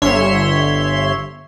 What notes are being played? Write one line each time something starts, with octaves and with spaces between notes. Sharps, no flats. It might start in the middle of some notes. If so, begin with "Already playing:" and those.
G1 C#5 E5 C6